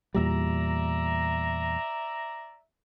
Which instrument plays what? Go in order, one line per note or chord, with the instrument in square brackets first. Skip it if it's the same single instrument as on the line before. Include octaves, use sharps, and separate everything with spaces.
[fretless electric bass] E2 A#2 G3 [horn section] D5 E5 A#5